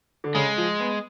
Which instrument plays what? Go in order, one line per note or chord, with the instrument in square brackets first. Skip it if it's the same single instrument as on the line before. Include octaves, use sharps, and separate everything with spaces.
[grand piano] D3
[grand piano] C#3 [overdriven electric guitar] G#3
[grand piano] F3
B3